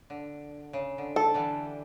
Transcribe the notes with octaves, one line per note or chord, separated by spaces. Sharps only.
D3
C#3
D3
A4
D3 E3 G3